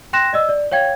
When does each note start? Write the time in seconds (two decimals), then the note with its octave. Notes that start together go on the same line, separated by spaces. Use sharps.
0.13 G5 C6 F#6 A#6 E7
0.33 D5 D#5 E6
0.49 D5
0.72 C#5 F5 G5 G#6